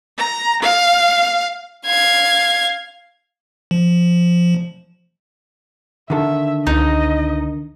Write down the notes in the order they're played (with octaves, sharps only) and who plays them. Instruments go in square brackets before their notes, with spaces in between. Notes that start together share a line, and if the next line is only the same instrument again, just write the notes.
[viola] A#5
F5
[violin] F5 G#6
[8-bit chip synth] F3
[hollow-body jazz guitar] D3 D#3 A4 [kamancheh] E5
[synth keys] C#2 A#6 [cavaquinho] D#4 [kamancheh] D#5